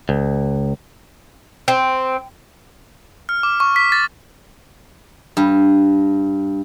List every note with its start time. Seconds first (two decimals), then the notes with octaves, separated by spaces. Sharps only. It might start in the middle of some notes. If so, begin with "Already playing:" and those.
0.09 C#2
1.68 C4
3.29 F6
3.43 D6
3.60 C#6
3.76 B6
3.92 A6
5.37 G2